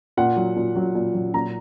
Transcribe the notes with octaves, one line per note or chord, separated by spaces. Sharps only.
A#2 F#5
F#3
A#2
F#3
A#2
F#3
A#2 A#5